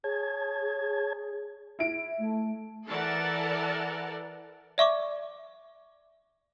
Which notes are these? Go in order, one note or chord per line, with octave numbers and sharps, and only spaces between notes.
G#4 C#5 A5 G#6
E4 D7
A3
E3 A4 A#4 D5 F#5 A5
D5 E5 C#6 D6